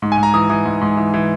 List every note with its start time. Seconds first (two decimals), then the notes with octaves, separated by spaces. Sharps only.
0.02 G#2
0.12 G#5
0.18 G#2
0.23 A#5
0.34 E3 D#6
0.49 E3 D#6
0.65 G#2
0.81 G#2
0.97 E3
1.14 E3